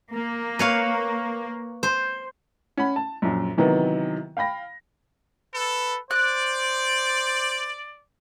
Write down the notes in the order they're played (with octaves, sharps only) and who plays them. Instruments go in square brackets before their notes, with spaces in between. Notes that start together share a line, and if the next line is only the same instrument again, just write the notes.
[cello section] A#3
[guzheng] B4 C#5 F5
C5
[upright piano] C#4 F#5 B5
A5
A#1 F#2
C3 D#3 E3 F#3 B3
F5 G5 B5 A#6
[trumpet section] A4 [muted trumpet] B4
[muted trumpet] C5 [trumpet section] D5 [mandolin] F#6